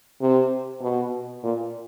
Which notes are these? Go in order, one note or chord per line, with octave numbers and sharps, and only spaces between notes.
C3
B2
A#2